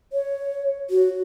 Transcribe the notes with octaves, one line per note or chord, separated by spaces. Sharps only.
C#5
F#4